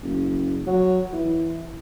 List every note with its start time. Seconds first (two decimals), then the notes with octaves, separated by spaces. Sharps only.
0.03 F#1
0.67 F#3
1.12 E3